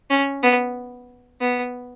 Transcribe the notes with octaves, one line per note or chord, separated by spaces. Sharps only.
C#4
B3
B3